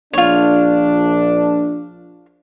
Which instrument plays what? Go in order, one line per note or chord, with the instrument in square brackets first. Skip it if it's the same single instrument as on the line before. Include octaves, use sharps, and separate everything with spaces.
[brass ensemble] A#1 D4 [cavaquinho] F4 C#5